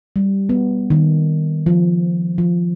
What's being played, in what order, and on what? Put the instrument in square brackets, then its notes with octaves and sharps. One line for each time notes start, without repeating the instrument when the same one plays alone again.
[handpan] G3
B3
D#3
F3
F3